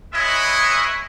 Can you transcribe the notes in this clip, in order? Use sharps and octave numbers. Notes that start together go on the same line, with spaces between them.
G#3 E4 B4 C#5 D#5 E5